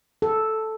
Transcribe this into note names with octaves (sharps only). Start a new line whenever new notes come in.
A4